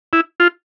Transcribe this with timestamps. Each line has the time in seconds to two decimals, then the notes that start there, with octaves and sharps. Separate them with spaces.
0.13 E4
0.40 F4